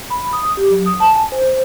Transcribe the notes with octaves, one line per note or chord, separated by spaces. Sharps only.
B5
D#6
G4
F#3
D#6
A5
G#5
C5